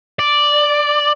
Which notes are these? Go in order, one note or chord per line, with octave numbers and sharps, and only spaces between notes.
D5